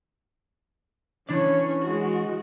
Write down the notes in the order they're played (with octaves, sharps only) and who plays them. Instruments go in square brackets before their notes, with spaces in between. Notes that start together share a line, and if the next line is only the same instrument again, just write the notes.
[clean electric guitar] E3 D4 D5 [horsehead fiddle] C#4 C#5
[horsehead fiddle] G#3 F#4